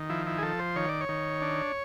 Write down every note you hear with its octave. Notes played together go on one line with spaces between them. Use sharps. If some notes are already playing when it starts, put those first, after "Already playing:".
Already playing: D#3
F3 E4
E4
G#4
F3 A4
C5
D#3 C#5
D5
C#5
D#3
D4